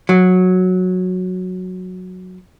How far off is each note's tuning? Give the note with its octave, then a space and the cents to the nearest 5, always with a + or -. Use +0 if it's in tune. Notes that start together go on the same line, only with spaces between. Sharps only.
F#3 -10